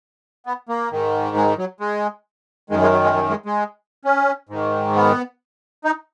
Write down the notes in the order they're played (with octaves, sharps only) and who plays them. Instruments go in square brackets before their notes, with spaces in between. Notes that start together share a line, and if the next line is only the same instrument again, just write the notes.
[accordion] B3
A#3
G#2 D#3
G#3
F#3
G#3
F#2 D#3 G#3
G#3
F#3
G#3
F#3
G#3
G#3
C#4
G#2 D#3
B3
D#4